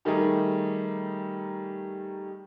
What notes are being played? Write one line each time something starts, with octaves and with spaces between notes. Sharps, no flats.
D#3 G3 A3 D#4 G#4 A#4